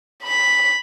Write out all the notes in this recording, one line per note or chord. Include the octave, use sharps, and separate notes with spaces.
B5 B6